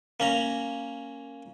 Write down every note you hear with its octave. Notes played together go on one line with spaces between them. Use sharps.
A#3 C#4 A#5